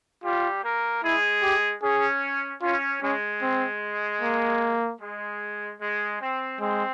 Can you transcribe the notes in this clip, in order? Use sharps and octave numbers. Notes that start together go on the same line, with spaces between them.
G3 F4 G4
A#3 A#4
G#3 E4 G#4
G4
C#4 G#4
C#4 F4
G#3 C#4
C4
A#3
G#3
G#3
C4
G#3 C4